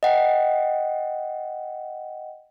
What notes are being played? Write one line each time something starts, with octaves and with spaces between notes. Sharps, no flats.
D#5 F#5 G5